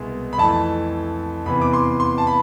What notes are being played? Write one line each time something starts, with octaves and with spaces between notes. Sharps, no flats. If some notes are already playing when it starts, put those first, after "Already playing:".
Already playing: C2 B2 G#3
B5
F2 E3 A3 A5
E2 C3 E3 B3 B5
D6
C6
C6
A5
B5